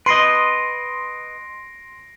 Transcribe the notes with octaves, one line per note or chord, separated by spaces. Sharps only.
B4 D#5 C6 A#6 C7 D7